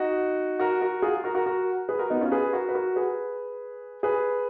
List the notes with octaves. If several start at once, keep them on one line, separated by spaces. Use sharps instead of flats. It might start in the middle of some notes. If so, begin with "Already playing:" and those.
Already playing: D#4 F#4
F#4 A#4
F#4 A#4
F4 G#4
F#4 A#4
F#4 A#4
F#4 A#4
G#4 B4
F#4 A#4
B3 D#4
C#4 F4
G#4 B4
F#4 A#4
B4
F#4 A#4
G#4 B4
G#4 B4